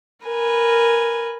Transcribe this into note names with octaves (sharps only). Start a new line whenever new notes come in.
A#4 B4 G#5